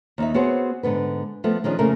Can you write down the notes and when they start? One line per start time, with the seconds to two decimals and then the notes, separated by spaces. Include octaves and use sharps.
0.18 D#2 D#4 E5
0.34 B3 C4 F#4 G#4 C5 C#5
0.83 G#2 D3 B3 B4
1.44 F3 A3 B3
1.64 D#3 F3 C#4 D4 G#4
1.79 F2 C#3 A3 A#3 A#4